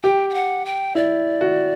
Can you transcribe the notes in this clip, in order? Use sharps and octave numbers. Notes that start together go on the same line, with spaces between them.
G4 G5
G5
F#5
G5
E4 D5
F#4